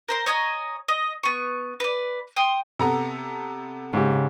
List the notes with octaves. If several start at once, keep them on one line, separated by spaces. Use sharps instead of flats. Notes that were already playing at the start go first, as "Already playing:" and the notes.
A#4 C5 C6
C#5 D#5 G#5 A#5
D#5
B3 C#6
B4 D5
G5 C6 D#6
C3 B3 A4 A#5
G#2 C#3 G4